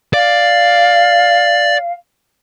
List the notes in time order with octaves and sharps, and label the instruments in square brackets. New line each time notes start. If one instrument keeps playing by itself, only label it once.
[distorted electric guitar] D5 [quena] F5